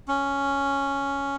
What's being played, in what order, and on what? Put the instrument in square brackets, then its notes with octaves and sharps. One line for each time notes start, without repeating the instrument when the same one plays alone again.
[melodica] C#4